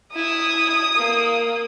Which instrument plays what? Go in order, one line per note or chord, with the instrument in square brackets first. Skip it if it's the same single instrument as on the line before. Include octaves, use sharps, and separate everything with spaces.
[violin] E4 [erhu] D#6
[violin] A#3